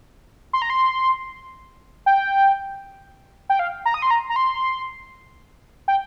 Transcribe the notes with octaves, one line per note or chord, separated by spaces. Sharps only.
C6
A#5
C6
G5
G5
F5
A#5
D#6
C6
A#5
A#5
C6
G5